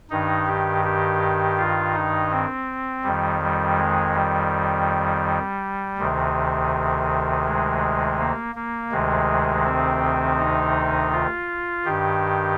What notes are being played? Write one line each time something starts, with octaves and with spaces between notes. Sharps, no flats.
G2 D#3 D#4
G4
G4
F4
D#4
C4
F2 D#3 G3
G3
G#3
G3
D2 C3 D#3
G#3
A#3
A#3
D2 C3 D#3 G#3
C4
D#4
F4
G2 D#3 G4